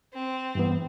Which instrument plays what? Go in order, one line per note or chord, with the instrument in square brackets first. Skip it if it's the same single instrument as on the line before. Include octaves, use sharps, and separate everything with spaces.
[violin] C4
[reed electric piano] G2 E3 B3